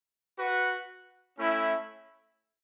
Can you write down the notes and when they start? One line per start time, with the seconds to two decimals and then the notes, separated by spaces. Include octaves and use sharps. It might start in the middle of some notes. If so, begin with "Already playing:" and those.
0.38 F#4 B4 F#5
1.38 A3 C#4 E4